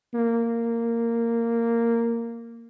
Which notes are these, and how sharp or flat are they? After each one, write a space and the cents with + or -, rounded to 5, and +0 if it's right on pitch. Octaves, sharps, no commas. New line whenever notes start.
A#3 -10